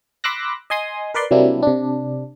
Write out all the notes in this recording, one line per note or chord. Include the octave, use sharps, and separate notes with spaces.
B5 C6 D6 E6 F#6 A#6
D#5 G#5 C6 D#6
A#4 B4 D5 C6
C3 F#3 G3 A#3 D4 E4
C3 D4